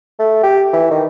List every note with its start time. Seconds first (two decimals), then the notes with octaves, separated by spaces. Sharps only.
0.19 A3
0.43 G4
0.73 E3
0.91 D#3